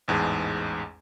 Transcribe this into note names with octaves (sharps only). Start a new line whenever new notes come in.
A1 E2 G#2 G#4 A5